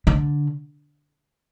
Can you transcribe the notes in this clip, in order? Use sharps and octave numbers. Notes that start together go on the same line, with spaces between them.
D3